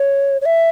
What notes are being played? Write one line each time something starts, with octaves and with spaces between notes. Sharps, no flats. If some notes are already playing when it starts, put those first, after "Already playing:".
Already playing: C#5
C#5
E5